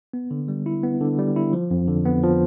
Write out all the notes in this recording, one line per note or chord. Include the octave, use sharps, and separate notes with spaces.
B3
D3
G3
E4
B3
D3
G3
E4
F3
F2
D3
B3
F3